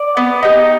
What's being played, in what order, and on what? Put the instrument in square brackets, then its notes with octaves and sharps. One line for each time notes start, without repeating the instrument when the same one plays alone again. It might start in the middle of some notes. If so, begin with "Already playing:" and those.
Already playing: [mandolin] D5
B3
D#4 G4